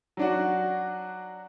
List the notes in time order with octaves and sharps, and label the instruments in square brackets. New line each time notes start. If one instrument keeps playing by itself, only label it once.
[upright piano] F#3 D4 F#4